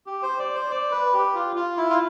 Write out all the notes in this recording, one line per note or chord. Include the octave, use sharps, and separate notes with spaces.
G4
C5
D5
C5
D5
B4
G4
F4
F4
E4
F4